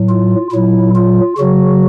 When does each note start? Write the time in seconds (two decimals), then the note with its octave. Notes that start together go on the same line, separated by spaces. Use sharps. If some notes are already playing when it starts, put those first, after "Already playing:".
Already playing: A2 F#3
0.09 F4
0.52 A#2 F#3 E4
0.95 F4
1.38 C#3 F#3 F#4